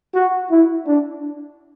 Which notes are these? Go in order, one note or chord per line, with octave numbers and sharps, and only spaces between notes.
F#4
E4
D4